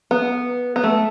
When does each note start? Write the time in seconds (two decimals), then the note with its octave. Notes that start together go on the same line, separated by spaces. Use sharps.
0.11 B3
0.76 B3
0.83 A3